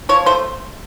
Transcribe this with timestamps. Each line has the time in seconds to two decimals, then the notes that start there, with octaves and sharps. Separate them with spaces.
0.09 F3 C#5
0.26 A3 C5